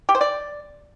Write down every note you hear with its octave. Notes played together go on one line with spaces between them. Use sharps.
G4
C5
D5